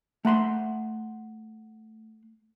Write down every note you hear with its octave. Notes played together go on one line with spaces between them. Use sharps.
A3 F#5 B5 C6